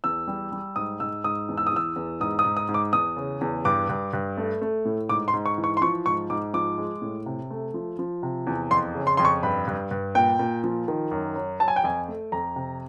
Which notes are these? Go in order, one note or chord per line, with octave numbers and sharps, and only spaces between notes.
E2 E6
G3
G3
G#2 D#6
G#2 E6
G#2 D#6
E2
E6
D#6
E3 E6
E2
G#2 D#6
D#6
G#2
D#6
G#2
D6
E2 D#6
C#3
E2
G2 D6
G2
G2
A3
A3
A2
G#2 D6
C6
G#2
C#6
E3
C#6
C6
F3 C#6
G#2 C#6
G#2 D6
F3 D6
G#3
A2
C3
A3
F3
F3
C3
E2
F2 C6
C#3
C6
F2 C6
C#6
G2 B5
G2
G2
A#2 G5
A#2
F3
D#3
F#2
F#3
F#3 A5
G#5
G5
F2 G#5
A3
F2 A#5
C3